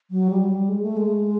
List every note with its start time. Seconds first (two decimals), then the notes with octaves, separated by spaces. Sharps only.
0.11 F#3
0.30 G3
0.45 F#3
0.49 G3
0.69 G#3
0.83 A3
0.97 G#3